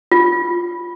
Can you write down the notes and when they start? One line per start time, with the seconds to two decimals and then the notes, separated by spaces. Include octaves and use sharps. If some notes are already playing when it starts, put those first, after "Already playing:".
0.12 F4